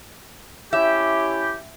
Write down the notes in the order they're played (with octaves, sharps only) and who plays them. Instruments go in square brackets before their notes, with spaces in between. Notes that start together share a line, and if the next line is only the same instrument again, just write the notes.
[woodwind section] C#4 E4 G4 [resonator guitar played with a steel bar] E5